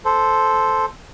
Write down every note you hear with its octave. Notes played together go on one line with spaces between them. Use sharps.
A4 C5